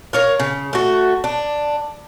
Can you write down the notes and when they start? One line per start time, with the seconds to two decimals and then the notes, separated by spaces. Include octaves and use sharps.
0.13 A#4 C#5 F5
0.40 C#3
0.73 A3 F#4
1.24 D4